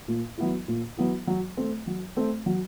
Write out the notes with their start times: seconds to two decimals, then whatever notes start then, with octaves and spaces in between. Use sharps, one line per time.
0.08 A#2
0.38 F#3 B3 E4
0.68 A#2
0.97 F#3 B3 E4
1.27 F#3
1.57 A3 C4
1.87 F#3
2.16 A3 C4
2.46 F#3